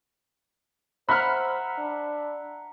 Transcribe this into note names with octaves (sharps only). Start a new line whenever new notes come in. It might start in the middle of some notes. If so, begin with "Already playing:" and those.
C5 E5 F#5 A#5 B5 F6
D4